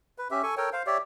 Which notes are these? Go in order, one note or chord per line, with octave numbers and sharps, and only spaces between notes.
B4
C#4 G4 E5
A4 G#5 C#6
A4 A#4 C#5 G5
C5 F5
G4 C#5 D5 E5